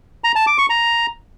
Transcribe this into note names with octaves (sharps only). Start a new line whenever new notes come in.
A#5
A5
D6
C#6
A#5